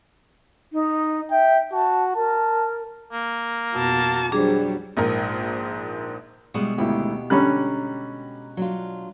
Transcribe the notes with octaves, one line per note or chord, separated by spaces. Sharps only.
D#4
E5 G5
F#4 A5
A#4 A5
A#3
F2 B2 B3 F#4 A5
F#3 G3 D4 G#4 C5
A#1 G#2 A#4
B2 G3 G#3 E4
G#1 D2 E4 G4
D3 G3 C#4 A#5 B5 F#6
F#3 D4 F4